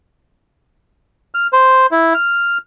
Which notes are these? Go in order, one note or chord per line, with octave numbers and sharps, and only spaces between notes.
F6
C5
E4
F6